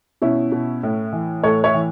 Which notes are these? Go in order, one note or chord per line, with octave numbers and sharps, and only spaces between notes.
B2 C#4 E4
B2
A2
E3
A2 A4 C#5
C#5 E5
E3